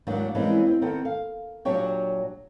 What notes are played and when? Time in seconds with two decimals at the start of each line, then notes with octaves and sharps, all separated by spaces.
0.07 D#2 G#2 F#3 A#3 D4
0.35 E3 G3 G#3 A#3 C4 C#4
0.67 C4
0.82 D#3 B3 C4 A4
1.05 F5
1.65 A#2 F#3 D4 G4 C#5 G5